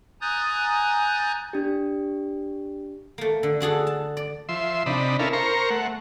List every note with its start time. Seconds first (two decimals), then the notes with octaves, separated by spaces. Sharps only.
0.21 G#5 A#5 D#6 F#6 G6 A6
1.53 D4 G4
3.18 A3 A#3
3.43 D3
3.60 D4 F#4 G#4 A4
3.87 A5
4.17 D5
4.49 F3 E5 C6
4.86 C3 D4 D#4 B5
5.19 C#4 E4 A4 A#4 F5 B5
5.33 A#4 C5 A#5 C#6
5.70 A3 F#5